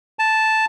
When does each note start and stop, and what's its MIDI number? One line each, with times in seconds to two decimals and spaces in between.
0.19 0.65 81